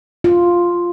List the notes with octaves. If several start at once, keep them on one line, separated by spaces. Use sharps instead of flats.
F4